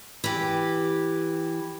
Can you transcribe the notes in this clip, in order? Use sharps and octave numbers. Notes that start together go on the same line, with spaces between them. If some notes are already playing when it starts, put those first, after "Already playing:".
E3 G4